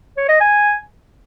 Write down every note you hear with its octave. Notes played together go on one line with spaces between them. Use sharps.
C#5
D#5
G#5